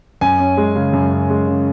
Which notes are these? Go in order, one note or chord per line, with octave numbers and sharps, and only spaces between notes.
F#2 G#5
C#4
G#3
C#3
F#2
C#4
G#3
C#3